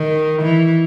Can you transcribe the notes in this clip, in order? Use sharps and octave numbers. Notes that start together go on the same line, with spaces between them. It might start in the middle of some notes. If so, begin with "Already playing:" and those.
Already playing: D#3
E3